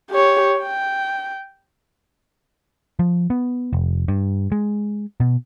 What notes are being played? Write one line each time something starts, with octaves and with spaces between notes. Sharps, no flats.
G4 C#5
G5
F3
B3
F1
G2
G#3
B2